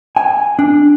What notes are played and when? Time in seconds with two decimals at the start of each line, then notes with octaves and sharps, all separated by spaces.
0.16 G#5
0.59 D4